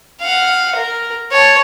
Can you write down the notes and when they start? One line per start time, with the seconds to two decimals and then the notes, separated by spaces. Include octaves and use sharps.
0.21 F5 F#5
0.76 A#4
1.32 C#5 A5